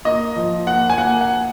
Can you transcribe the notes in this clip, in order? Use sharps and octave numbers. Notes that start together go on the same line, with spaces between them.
A#3 D#5
F3
A#3 F#5
G#5
A#3 F#5
F#5